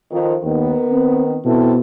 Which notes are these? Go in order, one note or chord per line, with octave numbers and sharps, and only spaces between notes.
F2 D#3 F3
D#2 D#3 B3
C4
B2 C4 E4 A4